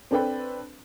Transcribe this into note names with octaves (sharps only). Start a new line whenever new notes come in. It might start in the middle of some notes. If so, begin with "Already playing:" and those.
C4 D4 A4 B4 G5